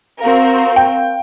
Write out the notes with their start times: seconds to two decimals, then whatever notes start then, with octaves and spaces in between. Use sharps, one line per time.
0.22 C4 F#4 A#4 F5
0.76 G5